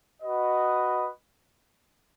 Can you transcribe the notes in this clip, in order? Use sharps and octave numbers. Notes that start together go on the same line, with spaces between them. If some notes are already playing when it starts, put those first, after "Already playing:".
F#4 B4 D#5